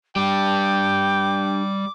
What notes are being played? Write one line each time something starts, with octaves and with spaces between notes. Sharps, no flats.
G3 D4 G4 G5 D6